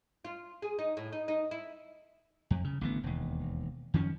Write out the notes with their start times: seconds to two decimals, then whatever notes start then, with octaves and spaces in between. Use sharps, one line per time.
0.25 F4
0.62 G#4
0.79 D#4
0.97 A2
1.12 D#4
1.28 D#4
1.51 E4
2.51 F2
2.64 C#3
2.81 A1 D3 B3
3.03 E1 D#2
3.94 F#2 D#3 F3 C#4